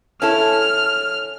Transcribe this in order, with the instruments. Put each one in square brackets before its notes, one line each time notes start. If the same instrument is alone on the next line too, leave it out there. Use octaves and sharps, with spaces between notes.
[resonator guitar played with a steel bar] C#4 E4 A4 [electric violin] F6